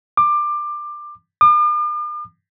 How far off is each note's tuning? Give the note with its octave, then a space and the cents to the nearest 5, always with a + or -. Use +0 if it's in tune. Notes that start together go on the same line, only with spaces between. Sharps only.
D6 +20
D6 +45